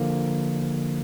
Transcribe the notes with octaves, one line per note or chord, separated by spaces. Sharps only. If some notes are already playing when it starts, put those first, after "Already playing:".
Already playing: D3 F3 A#3